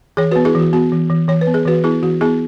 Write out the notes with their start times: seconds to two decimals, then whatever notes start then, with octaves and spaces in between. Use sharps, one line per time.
0.17 E3 G#4 C#5
0.31 B3 F#4 B4
0.45 E4 G#4
0.55 E3
0.60 F#4
0.73 B3 F#4
0.92 E3
1.10 E3
1.28 E3 C#5
1.41 B4
1.47 B3
1.54 G#4
1.66 E3 F#4 B4
1.84 B3 E4 G#4
2.03 E3 F#4
2.21 B3 E4 G#4